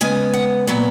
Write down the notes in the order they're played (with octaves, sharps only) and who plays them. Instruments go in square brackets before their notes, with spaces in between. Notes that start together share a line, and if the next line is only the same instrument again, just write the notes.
[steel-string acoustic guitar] C#3 G#3 B3 G#5
F#5
A#2 F#3 B3 F#5